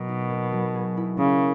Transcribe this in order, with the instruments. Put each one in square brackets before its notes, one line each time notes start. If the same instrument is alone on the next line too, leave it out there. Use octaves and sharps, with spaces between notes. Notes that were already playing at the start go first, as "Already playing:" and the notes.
Already playing: [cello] B2 [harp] F#3 A#3 A#4
[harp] D#4
A#3
F#3
G#4
E4
[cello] C#3 [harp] A#3